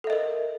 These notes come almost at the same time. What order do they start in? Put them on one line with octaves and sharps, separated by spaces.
A4 E5 D#5 A#4